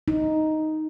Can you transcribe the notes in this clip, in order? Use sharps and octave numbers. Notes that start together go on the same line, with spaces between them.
D#4